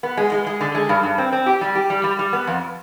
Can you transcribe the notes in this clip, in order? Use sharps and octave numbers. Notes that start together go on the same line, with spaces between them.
B3
G#3
G#3
G#3
D3
G#3
G2
G2
C4
C4
G4
G3
G4
G3
G3
G3
B3
F2